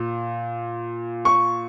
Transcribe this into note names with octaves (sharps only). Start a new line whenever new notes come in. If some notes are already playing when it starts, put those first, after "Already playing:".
Already playing: A#2
C#6